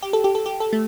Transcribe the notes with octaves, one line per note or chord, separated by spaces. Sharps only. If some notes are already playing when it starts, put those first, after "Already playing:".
G4
A4
G4
A4
G4
A4
A3